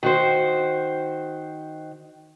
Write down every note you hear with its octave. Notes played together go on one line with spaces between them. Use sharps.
D#3 F#4 C5